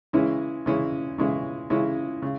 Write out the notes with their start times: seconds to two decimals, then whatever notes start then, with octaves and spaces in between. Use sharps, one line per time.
0.13 C#3 E3 G#3 C#4 E4
0.66 C#3 E3 G#3 C#4 E4
1.18 C#3 E3 G#3 C#4 E4
1.70 C#3 E3 G#3 C#4 E4
2.22 C#3